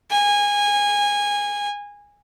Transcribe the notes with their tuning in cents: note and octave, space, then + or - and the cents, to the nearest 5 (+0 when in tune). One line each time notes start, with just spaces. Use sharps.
G#5 -20